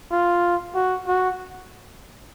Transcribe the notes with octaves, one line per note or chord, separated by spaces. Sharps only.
F4
F#4
F#4